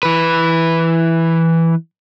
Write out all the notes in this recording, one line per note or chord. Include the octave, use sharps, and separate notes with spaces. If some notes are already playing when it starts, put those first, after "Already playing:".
E3 B4